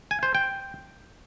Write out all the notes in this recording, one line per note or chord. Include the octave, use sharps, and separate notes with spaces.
G#5
C5
G5